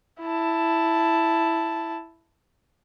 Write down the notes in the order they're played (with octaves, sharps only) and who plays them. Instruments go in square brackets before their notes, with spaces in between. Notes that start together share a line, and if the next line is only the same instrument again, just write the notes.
[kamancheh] E4 A5